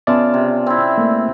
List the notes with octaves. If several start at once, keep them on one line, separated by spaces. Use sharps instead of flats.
C#3 B3 F4 D5 E5 A5
C3
C4 E4
A3 A#3